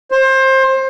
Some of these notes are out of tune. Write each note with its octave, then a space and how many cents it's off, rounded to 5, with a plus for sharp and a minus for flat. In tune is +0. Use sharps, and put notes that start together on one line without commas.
C5 +25